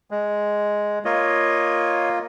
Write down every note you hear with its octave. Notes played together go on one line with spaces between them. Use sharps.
G#3
A#3 F4 C#5 D#5